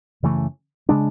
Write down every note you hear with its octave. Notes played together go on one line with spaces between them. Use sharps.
F#2 C#3 E3 A3
C#3 G#3 D4